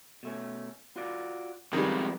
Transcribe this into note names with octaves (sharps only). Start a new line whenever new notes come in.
B2 A3 C#4
F4 F#4 D5
C3 D#3 F3 G3 G#3 B3 A#4